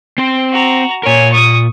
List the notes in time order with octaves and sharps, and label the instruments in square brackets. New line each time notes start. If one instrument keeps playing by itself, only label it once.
[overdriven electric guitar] C4 C5
[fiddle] F#4 A#5
[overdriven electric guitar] A#2 A#4 [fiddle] C#5 G#5
[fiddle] C#6 D#6